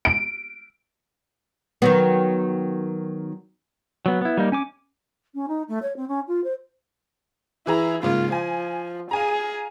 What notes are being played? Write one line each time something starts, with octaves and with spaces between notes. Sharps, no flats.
D7
D#3 F#3 B3
F#3 B3
B3 E4
G3 A#3 D#4
C#4 G#5 D6
C#4
D#4
A3
C#5
C4
C#4
F4
C5
E3 E4 G#4 A#5
G#2 C#3 A#3 F4
F3 G#5
G#4 F5 G#5 A#5